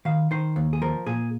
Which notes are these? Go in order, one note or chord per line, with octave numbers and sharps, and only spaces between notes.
D#3 F5
D#3 C5
D#2
G#4
F3 A#4
A#2 G#4